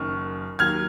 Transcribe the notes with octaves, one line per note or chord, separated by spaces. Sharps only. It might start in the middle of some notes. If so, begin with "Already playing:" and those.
Already playing: F#1 F#2 D#3 C#6 F6
D#2 D#3 F#3 F6 G#6